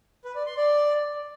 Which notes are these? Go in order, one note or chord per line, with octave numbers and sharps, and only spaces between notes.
B4
D5
C6
D5